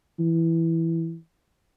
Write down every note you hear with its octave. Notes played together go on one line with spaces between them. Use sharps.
E3